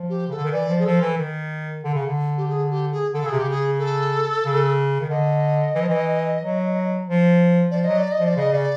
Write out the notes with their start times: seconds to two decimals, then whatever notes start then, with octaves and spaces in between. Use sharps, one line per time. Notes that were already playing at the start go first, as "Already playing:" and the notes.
Already playing: F3
0.10 G4
0.28 C#3 A4
0.36 D3
0.44 D#3
0.52 E3 D5
0.69 F3
0.79 G#4
0.86 F3 A4
1.02 E3
1.18 D#3
1.84 D3
1.94 C#3
2.06 D3
2.37 G4
2.49 G#4
2.71 G4
2.92 G#4
3.14 D3 A4
3.22 C#3 G#4
3.31 C3
3.38 C#3 G4
3.50 G#4
3.79 A4
4.45 C#3
5.01 D#3
5.09 D3 D#5
5.75 E3
5.82 F3
5.89 E3
6.41 F#3
7.06 F3
7.71 F3 D5
7.84 F#3 D#5
7.98 D5
8.12 D#5
8.20 F3 D5
8.36 C#3 D#5
8.52 C#3 D5